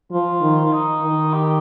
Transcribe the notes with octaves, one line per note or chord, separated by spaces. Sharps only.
F3 F4
D#3
D#4
D#3
G4